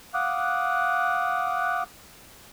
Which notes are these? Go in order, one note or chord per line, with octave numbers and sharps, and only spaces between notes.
F5 F#5 D6 D#6 F#6